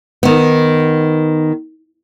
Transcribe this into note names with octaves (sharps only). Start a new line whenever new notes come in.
D#3 B3